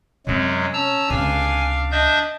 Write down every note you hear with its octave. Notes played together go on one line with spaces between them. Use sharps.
F#2 C3 F#3 G#3 C4
C#4 A5 A#5 E6
C#2 C3 D4 F5 G#5
D4 D#5 E5 G6